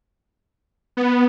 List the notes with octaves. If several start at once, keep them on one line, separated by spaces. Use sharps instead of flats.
B3